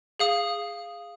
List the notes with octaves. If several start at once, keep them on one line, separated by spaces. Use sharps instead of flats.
G#4 F5 D#6